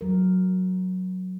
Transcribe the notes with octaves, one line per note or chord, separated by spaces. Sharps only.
F#3 A#4